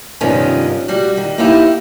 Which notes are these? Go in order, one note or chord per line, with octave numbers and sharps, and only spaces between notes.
G2 C3 D#3 F3 B3 C#4
G3 F#4
D#3
A#3 B3 D#4 E4 G4